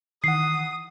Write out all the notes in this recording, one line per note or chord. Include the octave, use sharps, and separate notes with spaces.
D#3 E3 F#5 D#6 C7